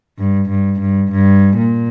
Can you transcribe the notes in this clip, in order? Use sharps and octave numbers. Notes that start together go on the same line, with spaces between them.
G2
G2
G2
G2
A#2